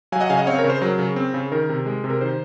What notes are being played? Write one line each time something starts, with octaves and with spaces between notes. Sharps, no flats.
F#3 F5 G#5
D#5 F#5
C#3 F5 G#5
D#5 F#5
C4 C#5 F5
A#4 C#5
C#3
C5
F#3 A#4
C#3
C4
C#3
D#3 A#4
C3
G#3
C3
A#4
D#3 C5